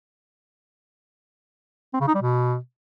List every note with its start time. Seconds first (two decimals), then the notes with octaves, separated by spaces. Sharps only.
1.94 C4
2.01 C#3
2.08 D#4
2.15 G3
2.22 B2